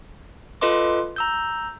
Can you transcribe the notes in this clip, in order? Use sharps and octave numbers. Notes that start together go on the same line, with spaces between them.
F4 A4 B4 D#5 C6 D6
A#5 E6 G6